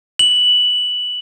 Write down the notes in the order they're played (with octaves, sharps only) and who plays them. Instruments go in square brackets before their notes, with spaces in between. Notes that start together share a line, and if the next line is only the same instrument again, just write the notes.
[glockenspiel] F#7